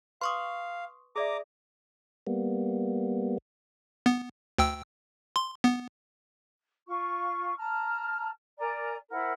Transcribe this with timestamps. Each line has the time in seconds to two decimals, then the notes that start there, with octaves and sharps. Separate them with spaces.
0.21 B4 F5 C6 C#6 D#6
1.16 G#4 D5 E5 A#5 D6 D#6
2.27 G3 A#3 B3
4.06 B3
4.58 D2 G5 E6
5.36 C6
5.64 B3
6.87 F4 C#6
7.57 A5 A#5 F6
8.58 A#4 D5 G#5 A#5
9.11 E4 A#4 C5 F#5